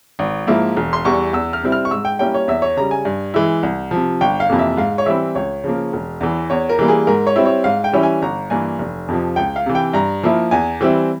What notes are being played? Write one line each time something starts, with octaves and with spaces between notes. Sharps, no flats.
G#1
G#2 F3 A#3 E4
E1
C6
E2 E3 G3 C#6
E2 E6
F6
C3 G3 C4 E4
F6
C#6
G#2 E6
G5
G3 A#3 C#4 E4 G5
C#5
E2 E5
C#5
C#3 G3 A#5
G#5
G2
E3 G#3 E4
C2
C3 F3
G1 G5
F5
F2 C3 E3 A#3
E5
G#2 F5
C#5
E3 G3 C4 E4 E5
C#2 C#5
C#3 F3 A#3
E1
E2 E3
E2 C#5
A#4
E3 G3 A#3
G#4
G#2 A#4
C#5
G3 C4 E4
C#5
G#2 F5
G5
E3 G3 C#4 E4
G#5
G1 A#5
G2 E3 A#3 G#5
F1
F2 C3 F3
C#2 G5
F5
C3 E3
G5
G2 A#5
F3 A#3 E4
E2 G#5
E3 G3 C4 E4